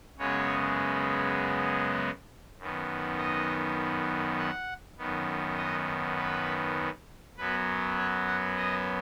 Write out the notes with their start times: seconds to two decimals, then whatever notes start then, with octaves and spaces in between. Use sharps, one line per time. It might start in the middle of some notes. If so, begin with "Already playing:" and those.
0.18 F#2 C#3 G#3 B3 C#5
2.58 F#2 D#3 B3
3.18 D#5
4.38 F#5
4.98 F#2 D#3 B3
5.58 D#5
6.18 B4
7.37 F#2 F#3 B3 B4
7.97 C#5
8.27 F#5
8.57 D#5